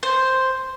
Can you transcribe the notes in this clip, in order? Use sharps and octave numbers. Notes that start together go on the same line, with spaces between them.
C5